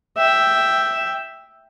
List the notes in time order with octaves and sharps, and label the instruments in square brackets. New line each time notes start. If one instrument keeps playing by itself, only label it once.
[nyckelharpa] E5 G5